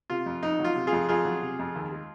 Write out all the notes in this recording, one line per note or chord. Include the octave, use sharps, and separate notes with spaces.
C3 F4
F2
F2 D#4
F#3
F4
C3
F4 G#4
F2
F2 F4 G#4
F#3
C3
F2
D#2
G#3